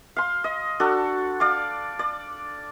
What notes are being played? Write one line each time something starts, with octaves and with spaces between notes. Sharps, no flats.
F5 C6
D#5
D4 F#4 A4
D5 F5 D6
D5